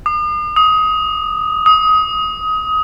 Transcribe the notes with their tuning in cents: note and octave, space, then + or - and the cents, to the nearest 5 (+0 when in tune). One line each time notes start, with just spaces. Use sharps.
D#6 -45
D#6 +20
D#6 +25